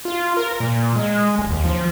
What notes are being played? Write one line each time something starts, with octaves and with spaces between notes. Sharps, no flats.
F4
A#4
A#2
G#3
D1
D#2
F3